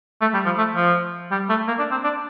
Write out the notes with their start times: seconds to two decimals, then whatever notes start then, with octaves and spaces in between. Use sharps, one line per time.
0.21 A3
0.34 G3
0.46 F3
0.58 A3
0.76 F3
1.31 G3
1.49 A3
1.68 A#3
1.79 D4
1.91 C4
2.04 D4